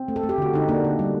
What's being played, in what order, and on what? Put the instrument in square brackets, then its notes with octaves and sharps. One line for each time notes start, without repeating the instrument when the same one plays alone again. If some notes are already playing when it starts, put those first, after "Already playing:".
Already playing: [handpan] C4
A3
A4
A3
G4
D3 F#4
D3 D#4
A#3 D4
D3
G3